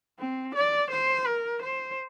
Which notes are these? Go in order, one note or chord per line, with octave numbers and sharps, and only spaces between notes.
C4
D5
C5
A#4
C5